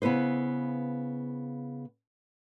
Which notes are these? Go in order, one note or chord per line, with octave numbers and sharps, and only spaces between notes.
C#3 B3 E4 B4 C5